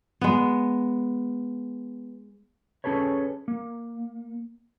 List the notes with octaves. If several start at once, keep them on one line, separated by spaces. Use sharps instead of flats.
G#3 B3
C#4 G#4 A4 B4 C#5
A#3